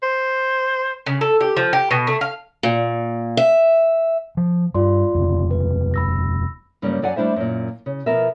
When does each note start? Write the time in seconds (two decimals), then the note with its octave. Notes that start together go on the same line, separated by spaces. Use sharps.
0.03 C5
1.06 C#3
1.21 A4
1.41 G4
1.57 F3
1.73 G4
1.91 B2
2.07 A3
2.21 F5
2.63 A#2
3.37 E5
4.37 F3
4.74 G2 F4 D5 C6
5.15 D#1 F2
5.51 B4
5.94 B5 E6 A#6
6.82 G2 C#3 F#3 G3 A#3 C#4
7.02 F#2 F#3 D5 F#5 G#5
7.16 G3 A3 D4 E4 C5 E5
7.36 F#2 A#2
7.86 C#3
8.06 B2 F3 B3 A#4 E5